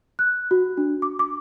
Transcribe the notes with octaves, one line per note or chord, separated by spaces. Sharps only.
F#6
F#4
D4
D6
D6